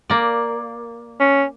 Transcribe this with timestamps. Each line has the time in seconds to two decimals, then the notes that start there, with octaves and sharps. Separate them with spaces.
0.10 A#3 D5
1.20 C#4